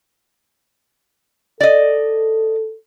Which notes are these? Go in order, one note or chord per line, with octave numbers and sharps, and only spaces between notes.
A4 D5 D#5